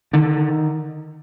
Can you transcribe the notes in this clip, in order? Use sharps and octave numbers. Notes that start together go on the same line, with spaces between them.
D3 D#3